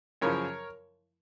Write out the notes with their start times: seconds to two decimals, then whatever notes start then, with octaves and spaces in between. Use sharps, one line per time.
0.22 F#2 C#3 F3 A#4 C#5